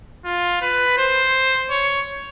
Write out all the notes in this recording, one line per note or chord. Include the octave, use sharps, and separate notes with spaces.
F4
B4
C5
C#5